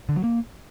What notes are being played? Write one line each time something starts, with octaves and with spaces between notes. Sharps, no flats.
D3
F#3
A#3